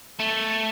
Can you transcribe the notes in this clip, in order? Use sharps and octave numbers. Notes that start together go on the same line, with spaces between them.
A3